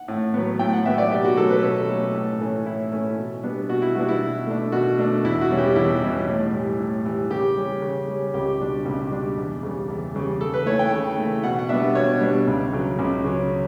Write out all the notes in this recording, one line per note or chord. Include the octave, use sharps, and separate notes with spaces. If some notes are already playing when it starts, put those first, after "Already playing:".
Already playing: F#5
A2
F#3 B3
A2 G5
F#5
F#3 B3 E5
D5
B2 G4
F#4
F#3 A3 C#4 A4
B4
B2 A4
F#3 A3 C#4
A2
E3 A3 C#4
A2 E4
E3 A3 C#4
B2
G3 B3 D4
B2 F#4
E4
G3 B3 D4 F#4
E4
B2
A3 D4
B2 F#4
A3 D4
E2 E4
F#4
B2 G3 C#4
G4
E2 E4
B2 G3 C#4
A2
E3 G3
A2
E3 G3
C#3 G4
G3 C#4
C#3
G3 C#4
C#2 G4
B2 G3 D4
C#2
B2 G3 D4
E2
C#3 G3
E2
C#3 G3
C#3 A4
B4
E3 A3 C#5
G5
C#3
E3 A3
B2 F#5
F#5
G3 B3 D4 E5
B2 C#5
G3 B3 D4
C#2
C#3 F#3 C#4
C#2
C#3 F#3 C#4